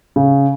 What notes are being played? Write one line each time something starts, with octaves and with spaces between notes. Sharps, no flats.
C#3